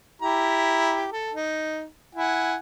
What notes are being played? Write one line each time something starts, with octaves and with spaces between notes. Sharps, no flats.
E4 G4 A#5
A4
D#4
E4 F#5 G#5